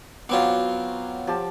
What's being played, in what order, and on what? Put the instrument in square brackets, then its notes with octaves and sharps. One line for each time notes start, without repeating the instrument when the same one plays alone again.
[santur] F#3 D6 [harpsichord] B3 C4 F4
[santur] F3 G4 A5